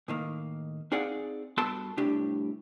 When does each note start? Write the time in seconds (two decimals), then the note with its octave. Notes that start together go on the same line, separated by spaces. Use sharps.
0.08 A2 D#3 A#3
0.92 C4 D#4 G#4 D5 F5 F#5
1.57 G2 B3 F#4 A4 A5 C6
1.97 C2 A2 C3 D4 G4